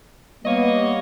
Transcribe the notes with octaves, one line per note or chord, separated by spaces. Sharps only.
G3 A#3 B3 C#5 D#5